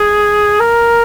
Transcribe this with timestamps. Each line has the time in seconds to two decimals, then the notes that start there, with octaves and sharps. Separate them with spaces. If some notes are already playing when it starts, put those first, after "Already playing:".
Already playing: G#4
0.60 A#4